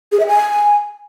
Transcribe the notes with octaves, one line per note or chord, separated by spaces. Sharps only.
G#4
E5
G#5